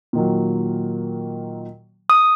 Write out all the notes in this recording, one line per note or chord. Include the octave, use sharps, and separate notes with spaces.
A#2 D#3 F#3
D#6